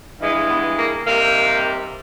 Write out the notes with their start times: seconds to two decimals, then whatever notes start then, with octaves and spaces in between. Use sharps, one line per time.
0.20 G2 E3 G#3
0.49 B3
0.78 A#3
1.06 C3 D#3 G3 A#3